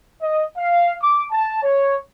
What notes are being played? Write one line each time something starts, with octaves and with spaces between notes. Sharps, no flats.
D#5
F5
D6
A5
C#5